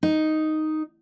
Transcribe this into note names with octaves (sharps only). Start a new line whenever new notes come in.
D#4